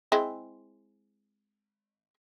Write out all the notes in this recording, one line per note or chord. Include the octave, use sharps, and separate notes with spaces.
G#3 C4 E4